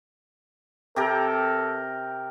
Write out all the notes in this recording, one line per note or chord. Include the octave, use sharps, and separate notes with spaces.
C3 G4 A4 A#4